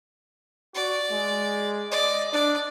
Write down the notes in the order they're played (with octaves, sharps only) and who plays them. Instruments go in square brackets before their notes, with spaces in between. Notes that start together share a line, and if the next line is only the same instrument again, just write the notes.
[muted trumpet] F#4 [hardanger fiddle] D5
[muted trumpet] G#3
[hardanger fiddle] D5 [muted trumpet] D#5
[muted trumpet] D4 [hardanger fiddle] D5